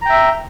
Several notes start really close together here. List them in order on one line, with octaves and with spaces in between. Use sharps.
A#5 G5 E5